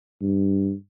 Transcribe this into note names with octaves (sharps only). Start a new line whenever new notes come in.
G2